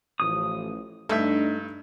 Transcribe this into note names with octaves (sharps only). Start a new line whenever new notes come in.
A1 F3 D#6
G2 A3 D4 D#4 E5